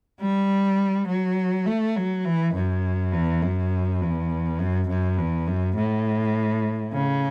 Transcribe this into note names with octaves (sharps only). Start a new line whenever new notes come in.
G3
F#3
A3
F#3
E3
F#2
E2
F#2
E2
F#2
F#2
E2
F#2
A2
C#3